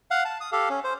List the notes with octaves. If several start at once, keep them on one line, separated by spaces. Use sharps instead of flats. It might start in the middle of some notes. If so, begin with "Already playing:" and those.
F5 F#5
A5
D#6
G4 A4 F5
C#4
C5